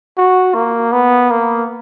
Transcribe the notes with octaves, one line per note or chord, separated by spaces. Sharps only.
F#4
A#3
B3
A#3